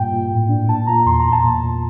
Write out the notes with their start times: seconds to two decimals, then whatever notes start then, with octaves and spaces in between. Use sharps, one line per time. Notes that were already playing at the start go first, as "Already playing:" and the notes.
Already playing: G2 A#2 G5
0.12 A#2
0.31 A2
0.49 D4
0.68 A#2 A5
0.87 A#2 A#5
1.06 E2 C6
1.20 A#5
1.25 E2
1.32 A5
1.44 A#2
1.62 A#2